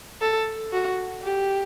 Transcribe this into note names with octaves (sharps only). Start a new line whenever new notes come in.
A4
F#4
G4